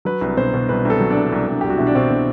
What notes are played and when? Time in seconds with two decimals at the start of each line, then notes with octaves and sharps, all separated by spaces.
0.05 F#3 B4
0.21 C2
0.37 B2 C5
0.54 B2
0.69 C2 B4
0.85 C2 A4
1.00 F#3
1.10 D4
1.17 C2
1.33 C2
1.47 C2
1.61 C2 G4
1.70 F#4
1.78 B2 E4
1.87 D4
1.95 B2 C4
2.10 B2